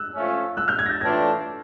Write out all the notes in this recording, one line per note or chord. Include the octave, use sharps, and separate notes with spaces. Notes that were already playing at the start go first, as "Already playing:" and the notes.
Already playing: E6 F#6
F3 A3 C#4
E6 F#6
F6 G6
F#6 G#6
A#6
G6 A6
A2 E3 A3 D4 F4 G#6 A#6